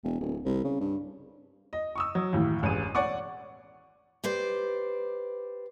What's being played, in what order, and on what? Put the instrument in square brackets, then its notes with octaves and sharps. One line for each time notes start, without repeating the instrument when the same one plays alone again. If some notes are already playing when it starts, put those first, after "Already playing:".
[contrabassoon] E1
D1
C2
C#3
G2
[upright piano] D#5
C#6 D#6 E6
F#3
D#2 A2 E3
E1 A1 G#4 D#7
C#5 D5 F#5 C#6 D6
[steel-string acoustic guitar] G4 B4 C5 D5